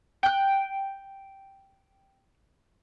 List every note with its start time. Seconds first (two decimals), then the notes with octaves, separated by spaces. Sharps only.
0.23 G5 F#6